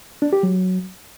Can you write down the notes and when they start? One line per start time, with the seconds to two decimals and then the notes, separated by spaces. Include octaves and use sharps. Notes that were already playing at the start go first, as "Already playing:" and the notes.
0.22 D4
0.33 G4
0.43 F#3